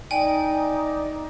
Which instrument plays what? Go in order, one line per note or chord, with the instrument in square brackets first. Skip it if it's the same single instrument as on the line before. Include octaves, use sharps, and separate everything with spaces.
[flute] D#4 [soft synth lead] D5 [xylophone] G5 G#5